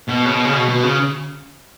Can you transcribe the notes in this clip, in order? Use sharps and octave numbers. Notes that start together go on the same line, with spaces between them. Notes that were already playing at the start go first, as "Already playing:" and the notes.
B2
C#3
B2
C#3
B2
B2
C#3